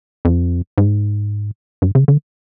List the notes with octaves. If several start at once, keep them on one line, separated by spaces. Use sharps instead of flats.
F2
G#2
G2
C#3
D3